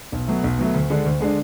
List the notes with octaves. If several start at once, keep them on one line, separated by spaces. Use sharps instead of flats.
B1
B2 F#3 A3
B1
B2 F#3 A3
D2
D3 G#3 D4
D2
D3 G#3 D4